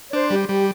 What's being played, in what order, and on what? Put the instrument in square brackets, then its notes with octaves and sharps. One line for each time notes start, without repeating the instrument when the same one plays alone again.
[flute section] C#5
[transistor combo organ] D4 [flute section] C5
[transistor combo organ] G3 [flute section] G4
[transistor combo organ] G3 [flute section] G4